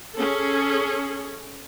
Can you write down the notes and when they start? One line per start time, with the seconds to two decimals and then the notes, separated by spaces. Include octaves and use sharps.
0.16 C#4 G#4 A4